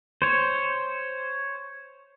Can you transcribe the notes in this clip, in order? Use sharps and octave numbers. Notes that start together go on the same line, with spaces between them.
C5 C#5